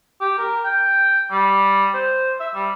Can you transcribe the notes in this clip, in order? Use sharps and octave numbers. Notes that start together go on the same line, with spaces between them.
G4
A#4
G5
G3
C5
E5
G3